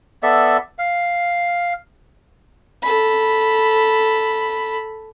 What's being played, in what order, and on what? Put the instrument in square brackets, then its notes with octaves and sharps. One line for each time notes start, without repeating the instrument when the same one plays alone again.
[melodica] B3 A4 D5 E5
F5
[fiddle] A4 B5